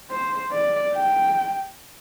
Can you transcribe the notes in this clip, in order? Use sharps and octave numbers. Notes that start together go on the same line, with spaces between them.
C5
D5
G5